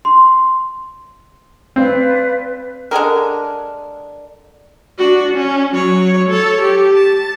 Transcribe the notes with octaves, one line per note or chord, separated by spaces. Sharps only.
C6
C4 B4 D5 F5
D3 G#3 G#4 A#4
D4 F#4
C#4
F#3 C#5
A4 C#5
G4
A5